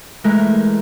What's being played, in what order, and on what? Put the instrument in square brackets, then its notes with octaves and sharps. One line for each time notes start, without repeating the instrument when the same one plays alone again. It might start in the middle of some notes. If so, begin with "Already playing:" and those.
[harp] E3 G#3 A3 A#4